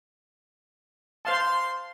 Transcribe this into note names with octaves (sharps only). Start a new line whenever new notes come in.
C5 F5 A5 C6